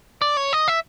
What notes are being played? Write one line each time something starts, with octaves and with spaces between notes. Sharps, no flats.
D5
C#5
D#5
E5